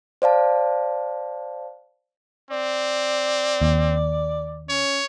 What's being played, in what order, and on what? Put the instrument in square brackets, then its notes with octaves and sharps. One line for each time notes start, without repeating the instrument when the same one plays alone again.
[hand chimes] C5 D5 F5 A5
[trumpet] C4 [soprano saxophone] D5
[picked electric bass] D#2
[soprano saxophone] C#4 [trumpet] C#5